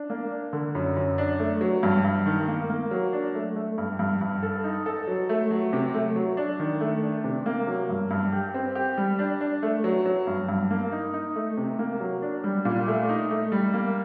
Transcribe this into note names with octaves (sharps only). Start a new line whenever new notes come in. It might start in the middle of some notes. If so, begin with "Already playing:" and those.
Already playing: D4
A#3
D4
D3
F#2
F#2
D4
A3
F#3
G2
G2
D#3
A#3
A#3
F#3
D4
A3
A3
G2
G2
G2
A4
D#4
A4
F#3
A3
F#3
C3
A3
F#3
D4
D#3
A3
D4
C3
A#3
F#3
G2
G2
G4
C4
G4
G3
D4
D4
A3
F#3
F#3
G2
G2
A#3
D#4
D#4
A3
C3
A#3
F#3
D4
G3
A#2
A3
D#4
A3
G3
A#3